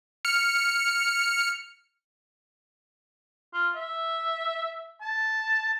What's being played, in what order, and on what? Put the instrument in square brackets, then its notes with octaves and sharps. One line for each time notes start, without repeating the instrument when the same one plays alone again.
[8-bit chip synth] F6 C#7
[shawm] F4
E5
A5